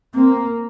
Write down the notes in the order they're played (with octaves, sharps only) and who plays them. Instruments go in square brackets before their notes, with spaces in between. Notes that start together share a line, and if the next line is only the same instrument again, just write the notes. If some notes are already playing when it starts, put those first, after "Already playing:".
[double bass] A#3 [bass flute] C4